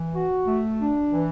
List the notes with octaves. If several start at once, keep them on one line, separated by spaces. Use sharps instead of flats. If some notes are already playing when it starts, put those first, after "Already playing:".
Already playing: E3
F#4
A3
D4
E3